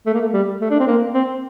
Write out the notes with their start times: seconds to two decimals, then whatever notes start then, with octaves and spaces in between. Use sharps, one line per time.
0.06 A3
0.14 A#3
0.21 A3
0.33 G3
0.61 A3
0.71 D4
0.79 C4
0.87 A#3
1.14 C4